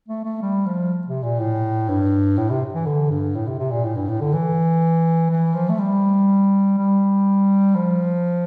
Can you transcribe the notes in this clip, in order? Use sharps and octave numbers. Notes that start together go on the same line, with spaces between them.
A3
A3
G3
F3
C3
A#2
A2
G2
A2
C3
E3
D3
G2
A2
C3
C3
A#2
A2
G2
A2
D3
E3
E3
F3
A3
G3
G3
F3